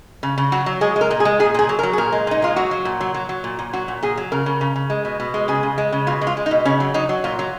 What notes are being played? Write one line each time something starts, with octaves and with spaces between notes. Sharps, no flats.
C#3
C#3
F#3 F#4
F#3
G#3 G#4
G#3
A#4
A#2
G#4
G#3
A#2 G#4
A#2 G#4
F#3
A#4
F#3
G#4
A#2 A#4
G#3
A#2 D#4
G#3 F4
F#3 F#4
F#3
A#2
F#3
F#3
F#3
A#2
A#2
F#3 F#4
A#2
A#2 G#4
F#3
C#3 A#4
C#3
C#3
C#3
G#3
B2
B2
G#3
C#3 G#4
C#3
G#3
C#3
B2 F4
G#3
F4
G#3
D#4
B2
C#3 C#4
F#3
F#3 D#4
F#3
A#2 F4
F#3